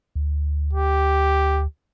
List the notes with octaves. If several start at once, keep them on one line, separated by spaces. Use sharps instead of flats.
D2
G4